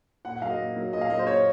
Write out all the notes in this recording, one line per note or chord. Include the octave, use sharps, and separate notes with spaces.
A#2 F#5
F#5
F#3 A#3 D#5 F5
A#2
F#3 A#3
A#2 D#5
F5
F#3 A#3 D#5
C5
A#2 C#5